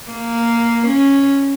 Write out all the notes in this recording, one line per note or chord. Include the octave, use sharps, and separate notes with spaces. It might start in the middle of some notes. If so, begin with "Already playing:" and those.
A#3
C#4